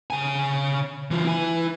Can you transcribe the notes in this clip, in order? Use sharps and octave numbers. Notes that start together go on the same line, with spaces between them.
C#3 G#5
E3 F4
E4 G#5